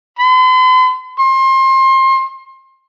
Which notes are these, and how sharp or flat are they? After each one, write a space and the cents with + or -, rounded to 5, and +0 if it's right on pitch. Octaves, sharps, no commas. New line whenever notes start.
C6 -45
C6 +30